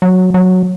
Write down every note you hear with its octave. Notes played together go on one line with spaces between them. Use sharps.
F#3
F#3